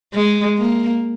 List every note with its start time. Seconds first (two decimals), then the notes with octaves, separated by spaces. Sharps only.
0.15 G#3
0.58 A#3